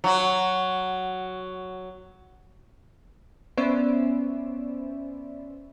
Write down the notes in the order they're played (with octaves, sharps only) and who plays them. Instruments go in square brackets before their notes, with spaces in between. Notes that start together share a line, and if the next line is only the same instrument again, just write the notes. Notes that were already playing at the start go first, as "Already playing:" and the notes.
[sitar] F#3 F#4
[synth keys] B3 C#4 C5 D5 E5